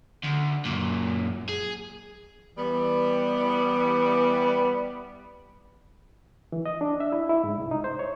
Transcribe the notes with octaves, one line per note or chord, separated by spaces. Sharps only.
D2
F#2 A#2
G#4
E3 G3 B3
E3
D#5
D4
E5
E4
E4
G#2
C2
D#4
C5
C#5